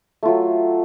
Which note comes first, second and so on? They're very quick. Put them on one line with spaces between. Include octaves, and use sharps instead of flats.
A3 F4 F#3